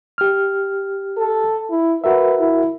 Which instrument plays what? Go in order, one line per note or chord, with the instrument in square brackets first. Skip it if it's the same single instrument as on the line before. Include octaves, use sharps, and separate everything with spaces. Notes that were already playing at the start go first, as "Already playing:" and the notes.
[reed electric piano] G4 F6
[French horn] A4
E4
[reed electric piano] F#4 A#4 E5 [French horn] B4
[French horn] E4